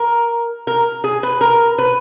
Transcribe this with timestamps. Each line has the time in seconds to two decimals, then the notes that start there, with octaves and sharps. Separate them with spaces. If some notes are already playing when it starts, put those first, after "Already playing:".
Already playing: A#4
0.67 A#4
1.04 G#4
1.23 B4
1.41 A#4
1.78 B4